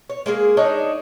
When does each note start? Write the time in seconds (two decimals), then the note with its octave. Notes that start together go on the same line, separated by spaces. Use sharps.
0.10 C#5
0.26 G#3 A#3 F#4 G#4
0.57 D4 D#4 C#5